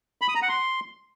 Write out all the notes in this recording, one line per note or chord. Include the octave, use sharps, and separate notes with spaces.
B5
D#6
A#5
F#5
C6